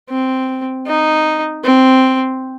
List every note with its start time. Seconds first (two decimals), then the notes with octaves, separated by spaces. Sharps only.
0.09 C4
0.87 D#4
1.64 C4